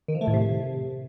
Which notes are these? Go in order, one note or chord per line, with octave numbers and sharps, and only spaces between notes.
D#3
F3
A3
A2
C3